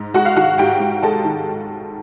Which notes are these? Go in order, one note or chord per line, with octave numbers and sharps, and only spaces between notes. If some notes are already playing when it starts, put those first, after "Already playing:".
Already playing: G#2
G#3 F#4 F#5
F5
D#3 F#4 F#5
G#2 G4 G5
G#2
G#3 A4 A5
D#3